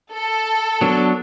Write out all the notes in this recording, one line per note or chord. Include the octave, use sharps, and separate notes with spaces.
A4
F#3 B3 D4